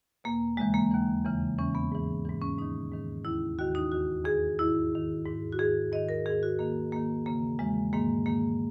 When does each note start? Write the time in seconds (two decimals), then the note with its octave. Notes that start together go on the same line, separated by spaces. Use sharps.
0.24 E2 B2 A#3
0.57 D#2 C#3 E3 G#3
0.74 A#3
0.91 D#2 C#3 E3
1.25 E2 C#3 E3
1.58 E2 C#3 E3 C#4
1.75 B3
1.92 G#2 E3
2.25 G#2 E3
2.41 C#4
2.59 G#2 D#3 D#4
2.92 G#2 D#3
3.25 D#2 D#3 E4
3.58 D#2 D#3 F#4
3.75 D#4
3.92 E2 D#3 F#4
4.25 E2 D#3 G#4
4.59 G#2 D#3 E4
4.92 G#2 D#3
5.25 G#2 D#3
5.53 F#4
5.59 G#2 D#3 G#4
5.92 G#2 D#3 D#5
6.09 A#4
6.26 D#3 G#4
6.30 G#2
6.43 F#4
6.59 G#2 D#3 A#3
6.92 G#2 D#3 A#3
7.26 E2 C#3 E3 A#3
7.59 E2 C#3 E3 G#3
7.93 G#2 D#3 A#3
8.26 G#2 D#3 A#3